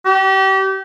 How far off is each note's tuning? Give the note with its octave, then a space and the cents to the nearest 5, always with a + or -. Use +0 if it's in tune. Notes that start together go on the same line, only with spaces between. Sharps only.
G4 -30